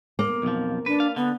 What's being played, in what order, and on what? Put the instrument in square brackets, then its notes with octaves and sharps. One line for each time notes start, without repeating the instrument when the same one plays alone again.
[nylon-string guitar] A#3
[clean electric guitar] B1 F2 F3
[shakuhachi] D4 [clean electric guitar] B4
[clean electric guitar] F5
[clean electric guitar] D3 [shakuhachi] B3